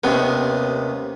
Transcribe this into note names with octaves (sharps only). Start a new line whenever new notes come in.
D#2 C3 D#3 B3 C#4